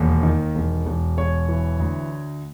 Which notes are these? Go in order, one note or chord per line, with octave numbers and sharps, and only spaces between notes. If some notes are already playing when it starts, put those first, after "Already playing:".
Already playing: E1 D#2
D#3
E1
E1
E1 C#5
E3
D2